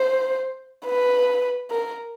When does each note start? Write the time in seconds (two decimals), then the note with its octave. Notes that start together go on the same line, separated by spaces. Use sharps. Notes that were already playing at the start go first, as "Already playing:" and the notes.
Already playing: C5
0.86 B4
1.71 A#4